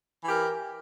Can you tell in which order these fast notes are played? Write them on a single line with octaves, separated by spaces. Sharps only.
E3 G4 A#4